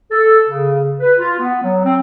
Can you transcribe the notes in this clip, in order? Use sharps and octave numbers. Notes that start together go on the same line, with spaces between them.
A4
C#3
B4
F4
B3
F#3
C4